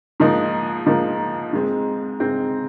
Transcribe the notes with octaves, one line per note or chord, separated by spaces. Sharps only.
G#2 F3 A#3 D#4
G#2 F3 A#3 D#4
G#2 G#3 C4
G#2 G#3 C4